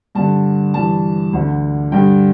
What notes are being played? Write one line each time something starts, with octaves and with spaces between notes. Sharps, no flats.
G2 D3 A5
G2 E3 A5
D2 D3
G2 D3 G5